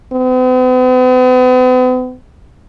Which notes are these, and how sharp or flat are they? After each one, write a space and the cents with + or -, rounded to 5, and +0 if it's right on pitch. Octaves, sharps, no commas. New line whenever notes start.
B3 +45